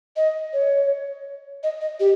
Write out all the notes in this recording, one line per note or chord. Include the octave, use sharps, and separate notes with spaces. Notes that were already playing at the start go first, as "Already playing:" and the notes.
D#5
C#5
D#5
D#5
G4